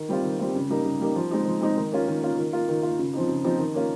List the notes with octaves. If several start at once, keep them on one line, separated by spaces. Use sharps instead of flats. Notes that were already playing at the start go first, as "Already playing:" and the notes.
Already playing: D#3
G3 C4 F4
D#3
G3 C4 F4
C#3
G3 A#3 D#4
C#3
G3 A#3 D#4
F3
G#3 C4 D#4
F3
G#3 C4 D#4
D#3
A#3 C#4 F4
D#3
A#3 C#4 F4
D#3
A#3 F4
D#3
A#3 F4
C#3
F3 C4 D#4
C#3
F3 C4 D#4
D#3
A#3 C#4 F4